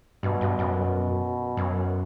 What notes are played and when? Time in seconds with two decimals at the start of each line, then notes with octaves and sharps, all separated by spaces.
0.23 G2 B2
0.41 G2
0.59 F#2
0.77 B2
1.57 F#2